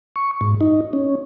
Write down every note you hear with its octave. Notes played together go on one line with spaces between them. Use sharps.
C#6
G#2
D#4
C#4